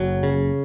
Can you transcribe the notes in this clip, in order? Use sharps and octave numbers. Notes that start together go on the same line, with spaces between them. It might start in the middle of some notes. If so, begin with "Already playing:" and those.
Already playing: F#1 F#3
C#3